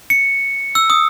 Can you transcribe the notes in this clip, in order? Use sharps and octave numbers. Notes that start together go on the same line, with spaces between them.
C#7
E6
D#6